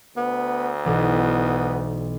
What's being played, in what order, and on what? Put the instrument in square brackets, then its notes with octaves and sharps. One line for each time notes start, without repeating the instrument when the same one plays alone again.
[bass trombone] D2 [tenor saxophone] B3
[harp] B1 E3 [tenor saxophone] B3